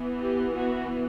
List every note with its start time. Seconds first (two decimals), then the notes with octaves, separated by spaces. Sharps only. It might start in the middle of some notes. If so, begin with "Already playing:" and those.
Already playing: E3 B3
0.19 G4
0.54 F#4